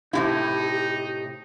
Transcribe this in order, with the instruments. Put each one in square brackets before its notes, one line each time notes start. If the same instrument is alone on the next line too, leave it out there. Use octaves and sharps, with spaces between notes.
[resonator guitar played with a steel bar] A2 C3 E4 [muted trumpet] D#4 [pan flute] G4